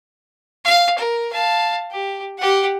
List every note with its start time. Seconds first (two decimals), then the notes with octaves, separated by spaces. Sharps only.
0.65 F5
0.98 A#4
1.32 F5 A5
1.91 G4
2.38 G4 F#5